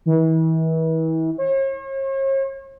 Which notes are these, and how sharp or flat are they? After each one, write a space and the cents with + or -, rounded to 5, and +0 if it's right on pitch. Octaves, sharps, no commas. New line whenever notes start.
E3 -40
C#5 -45